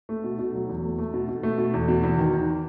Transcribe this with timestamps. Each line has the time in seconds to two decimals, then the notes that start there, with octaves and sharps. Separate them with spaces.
0.09 A3
0.24 B2
0.39 B2
0.54 F#3
0.68 E2
0.84 A3
0.98 A3
1.14 B2
1.29 B2
1.43 A3
1.58 B2
1.73 E2
1.88 B2
2.03 E2
2.18 D#3
2.33 E2